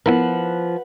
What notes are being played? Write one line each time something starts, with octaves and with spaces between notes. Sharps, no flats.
F3 B3 E4 A#4 B4 F#5